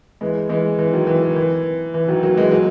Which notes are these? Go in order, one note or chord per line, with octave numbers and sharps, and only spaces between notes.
E3 G#3
E3 G#3
E3
D#3 F#3
E3
D#3
E3
E3
D#3 F#3
F#3 A#3
E3 G#3
F#3 A#3